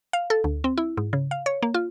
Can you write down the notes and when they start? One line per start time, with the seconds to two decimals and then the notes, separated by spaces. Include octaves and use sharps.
0.13 F5
0.30 A4
0.44 D2
0.64 C4
0.77 E4
0.97 G#2
1.13 C#3
1.31 F5
1.46 C#5
1.62 A#3
1.74 F4